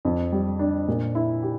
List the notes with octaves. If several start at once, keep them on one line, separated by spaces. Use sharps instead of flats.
F2
G3
D4
A#2
E4
G4